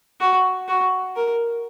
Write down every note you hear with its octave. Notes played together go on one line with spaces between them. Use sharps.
F#4
F#4
A#4